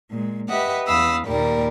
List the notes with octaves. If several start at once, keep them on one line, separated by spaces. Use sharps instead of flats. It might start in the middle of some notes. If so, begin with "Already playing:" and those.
A#2 G#3
G4 B4 D#5 E5 F#5
E2 F5 B5 D#6 E6
D#2 A#2 G3 A#4 D5